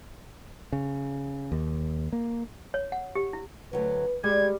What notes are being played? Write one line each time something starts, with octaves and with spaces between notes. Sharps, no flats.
C#3
D#2
A#3
C#5
F#5
G4
E4
D2 G2 F#3 B4
G3 G#3 G4 G#6